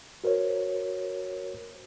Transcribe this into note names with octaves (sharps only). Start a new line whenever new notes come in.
F#4 A#4 C5 C#5